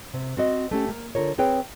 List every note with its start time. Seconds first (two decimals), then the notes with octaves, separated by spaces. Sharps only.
0.14 C3
0.37 C4 F#4 D#5
0.71 A3 C#4 G4
0.89 A#3
1.15 D3 F4 A#4 C#5
1.38 C4 G#4 B4 C#5 G5